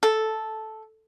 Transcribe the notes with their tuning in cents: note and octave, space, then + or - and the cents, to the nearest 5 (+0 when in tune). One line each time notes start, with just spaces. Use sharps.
A4 -5